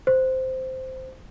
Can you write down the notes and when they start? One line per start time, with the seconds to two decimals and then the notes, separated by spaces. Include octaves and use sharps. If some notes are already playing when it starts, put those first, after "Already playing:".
0.07 C5